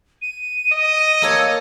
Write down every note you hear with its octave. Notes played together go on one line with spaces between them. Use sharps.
D#7
D#5
A#3 A4 C#5 E6